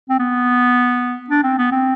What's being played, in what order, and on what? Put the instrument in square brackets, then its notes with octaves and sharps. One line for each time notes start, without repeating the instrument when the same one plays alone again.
[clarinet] C4
B3
D4
C4
B3
C4